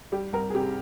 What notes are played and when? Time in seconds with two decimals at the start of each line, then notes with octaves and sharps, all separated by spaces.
0.12 G3 G4
0.33 C2 A#4
0.50 G#4
0.54 C3 G4